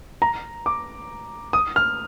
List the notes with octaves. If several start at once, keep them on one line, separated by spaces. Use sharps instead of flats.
A#5
D6
D#6
F6